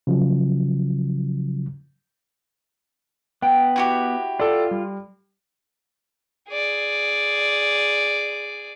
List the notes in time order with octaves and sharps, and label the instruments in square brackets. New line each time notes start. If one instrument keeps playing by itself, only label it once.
[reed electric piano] C#3 F3 F#3
[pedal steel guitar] B3 [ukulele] G5
[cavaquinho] E4 F#4 G4
[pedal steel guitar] F4 [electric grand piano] A4 D5
[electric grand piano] G3
[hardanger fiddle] G#4 D5